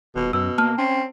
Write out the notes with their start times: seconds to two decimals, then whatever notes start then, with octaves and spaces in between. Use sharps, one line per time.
0.16 D#1 B2
0.33 F#2 B2 E6
0.58 A#3 A5 F6
0.78 C4 C#4